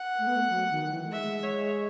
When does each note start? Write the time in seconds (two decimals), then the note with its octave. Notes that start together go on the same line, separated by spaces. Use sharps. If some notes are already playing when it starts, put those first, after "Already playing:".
Already playing: F#5
0.19 A3
0.27 B3
0.36 A3
0.49 F#3
0.71 D#3
0.91 E3
1.05 A3
1.11 G#3 E5
1.43 C#5